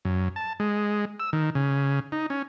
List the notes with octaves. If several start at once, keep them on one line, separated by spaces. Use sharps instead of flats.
F#2
A5
G#3
E6
D#3
C#3
D#4
C#4